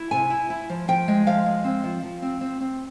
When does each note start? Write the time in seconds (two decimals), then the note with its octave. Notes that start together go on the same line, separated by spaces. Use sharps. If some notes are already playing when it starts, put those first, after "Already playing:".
Already playing: E4
0.11 C3 G#5
0.30 E4
0.50 E4
0.70 F3
0.88 F3 G5
1.08 G#3
1.27 F3 F5
1.46 G#3
1.64 C4
1.84 F3
2.03 F3
2.22 C4
2.41 C4
2.61 C4